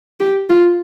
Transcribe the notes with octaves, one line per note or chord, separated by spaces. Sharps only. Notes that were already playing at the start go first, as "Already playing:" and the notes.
G4
F4